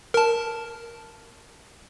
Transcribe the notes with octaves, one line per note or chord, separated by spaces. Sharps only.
A#4 A5